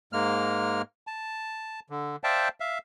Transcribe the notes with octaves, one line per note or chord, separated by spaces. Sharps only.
G#2 G#3 A#3 F6
A5
D3
C5 D5 E5 F5 G5 A5
E5 F5